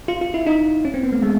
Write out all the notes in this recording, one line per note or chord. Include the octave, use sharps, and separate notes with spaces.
F4
F4
E4
D#4
C#4
C4
B3
A3
G#3